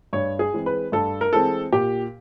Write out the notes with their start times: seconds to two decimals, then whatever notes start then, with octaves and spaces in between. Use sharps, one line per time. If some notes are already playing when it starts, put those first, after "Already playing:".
0.13 G2 C#5
0.39 G#4
0.53 E3 G#3 C4
0.66 B4
0.92 G2 A4
1.21 A#4
1.33 E3 G#3 C4 A4
1.73 A#2 G4